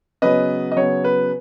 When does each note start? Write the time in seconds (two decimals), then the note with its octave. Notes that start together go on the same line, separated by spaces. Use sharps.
0.22 C#3 F#3 B3 B4 D#5
0.72 D#5
0.76 C#3 F#3 B3 C#5
1.04 B4